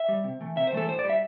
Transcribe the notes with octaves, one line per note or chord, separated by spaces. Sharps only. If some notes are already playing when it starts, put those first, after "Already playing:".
Already playing: E5
G3
C3
E3 A3
C3 E5
C5
E3 A3 A4
A2 C5
D5
G3
E5